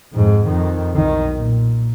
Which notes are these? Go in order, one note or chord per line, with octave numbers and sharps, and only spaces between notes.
F2 G#2
F2 D#3
B1 D#3
A#2